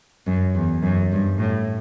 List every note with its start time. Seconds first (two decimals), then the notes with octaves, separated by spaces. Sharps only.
0.26 F#2
0.54 E2
0.82 F#2
1.11 G2
1.39 A2